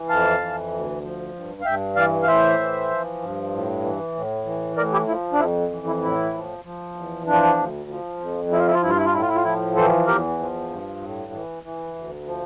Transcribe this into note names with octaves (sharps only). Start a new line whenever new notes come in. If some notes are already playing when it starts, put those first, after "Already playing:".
Already playing: E3
F2 F5 A5
E3
D2
F3
G2
F5
G2 E5 G5
E3 D5 F5
F5
A2 C5 E5
E3
F3
G2
A2
E3
A2
E3
A2 A#4 D5
E4 G4
F3 E4
D4
F2 E4
E3
E4
A2 E4
F3
F3
E2
F3 D4
D2
F3
F2
F3 E4
F4
E4
F4
G2 E4
F4
E4
F4
A2 E4
F4
E4
F4
F3 E4
E3 A4 C5
E2 G4 A#4
F3
G2
A2
E3
E3
D2
F3